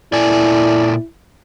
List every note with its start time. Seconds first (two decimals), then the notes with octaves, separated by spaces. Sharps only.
0.13 A#2 E4 A4 D5 G#5